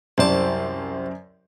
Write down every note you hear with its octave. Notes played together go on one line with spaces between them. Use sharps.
C2 F#2 C5 D5 A5